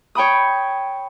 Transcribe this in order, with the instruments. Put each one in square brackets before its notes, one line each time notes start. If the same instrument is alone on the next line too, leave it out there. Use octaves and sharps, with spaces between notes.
[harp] C#5 G5 B5 D#6